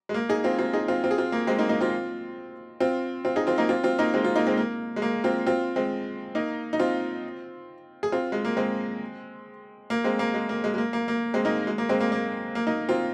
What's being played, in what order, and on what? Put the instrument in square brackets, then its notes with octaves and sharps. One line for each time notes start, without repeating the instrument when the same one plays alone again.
[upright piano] G#3
A#3
D#4 G#4
C4 F4
C4 F4
D#4 G#4
C4 F4
C4 F4
G#4
C4 F4
A#3
G#3 C4
A#3 D#4
A#3 D#4
C4 F4
C4 F4
C4 F4
D#4 G#4
C4 F4
A#3 D#4
C4 F4
C4 F4
A#3 D#4
G#3 C4
C4 F4
A#3 D#4
G#3 C4
A#3
G#3
A#3
C4 F4
C4 F4
G#3 C4
A#3 D#4
D#4
C4 F4
G#4
C4 F4
G#3
A#3
G#3 C4
A#3
G#3 C4
A#3
G#3
A#3
G#3
G#3
A#3
A#3
A#3
G#3 C4
A#3 D#4
G#3
A#3
G#3 C4
A#3
A#3
A#3
A#3 D#4
C4 F4